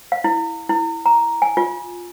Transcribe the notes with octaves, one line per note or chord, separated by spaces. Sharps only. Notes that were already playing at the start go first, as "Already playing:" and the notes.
F5
E4
E4
A#5
G#5
F4